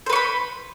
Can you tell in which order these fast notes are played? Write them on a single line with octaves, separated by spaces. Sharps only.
C5 B4 C#6 B5